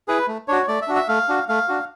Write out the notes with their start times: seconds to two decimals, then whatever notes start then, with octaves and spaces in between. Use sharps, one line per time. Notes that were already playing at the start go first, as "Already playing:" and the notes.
0.08 E4 G#4 B4
0.28 A3
0.48 D4 F#4 C#5
0.68 A3 D5
0.82 E5
0.88 D4 F#4
0.95 E5
1.09 A3 F5
1.29 D4 F#4
1.49 A3 F5
1.68 D4 F#4